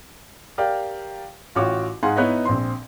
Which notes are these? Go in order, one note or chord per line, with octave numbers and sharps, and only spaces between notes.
G4 A#4 D5 F5 G5
A1 F4 F#4 C#5 G5 D6
G#2 G#4 F5 F#5 G#5 C6
B3 D#4 E4 B4 C#5 D#5
A#1 C4 C6